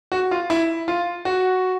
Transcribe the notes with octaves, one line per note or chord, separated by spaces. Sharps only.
F#4
F4
E4
F4
F#4